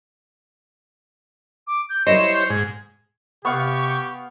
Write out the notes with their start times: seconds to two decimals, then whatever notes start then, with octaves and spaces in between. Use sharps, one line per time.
1.67 D6
1.89 G6
2.07 G3 E4 C5 C#5 D#5 E7
2.34 G6
2.50 G#2 G#6
3.45 C3 B3 G4 F5 C#6